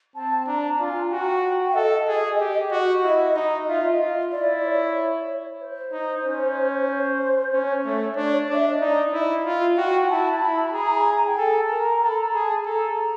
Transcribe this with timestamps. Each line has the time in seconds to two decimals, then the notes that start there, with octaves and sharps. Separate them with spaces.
0.15 C4 A5
0.47 D4 A#5
0.69 A#5
0.80 F4
0.90 G#5
1.12 F#4 G5
1.32 G5
1.54 G5
1.76 A4 D#5
2.08 G#4
2.40 G4
2.71 F#4
3.04 E4 D#5
3.36 D#4 D#5
3.68 F4 E5
3.90 D#5
4.00 F4
4.32 E4 D5
4.65 C#5
5.60 C5
5.92 D#4
6.24 C#4
6.83 C#5
6.89 C5
7.52 C#4 C#5
7.85 A3
8.16 D4
8.50 D4 E5
8.67 D#5
8.81 D#4 D5
9.13 E4 D#5
9.45 F4
9.77 F#4 G5
10.09 E4 A5
10.42 E4 B5
10.73 G#4 A#5
11.05 A#5
11.27 G5
11.38 A4 G#5
11.60 A5
11.70 A#4 A#5
12.02 A4 A#5
12.09 B5
12.17 A#5
12.33 G#4 A5
12.66 A4 A#5